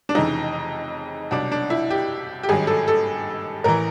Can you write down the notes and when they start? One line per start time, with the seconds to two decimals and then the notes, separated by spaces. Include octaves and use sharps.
0.09 D4
0.15 F1 F2 C#3 E3 D#4
1.31 C2 B2 F#3 D4
1.52 D4
1.70 E4
1.90 G4
2.43 G4
2.49 G#1 G2 D#3 F#3 G#4
2.67 A4
2.88 A4
3.64 A1 E3 A#4